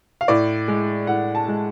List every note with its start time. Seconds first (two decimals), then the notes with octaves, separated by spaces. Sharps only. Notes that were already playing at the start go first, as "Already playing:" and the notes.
0.21 F5
0.28 A2 D5
0.68 G#3
1.07 A2 F#5
1.35 A5
1.48 G#3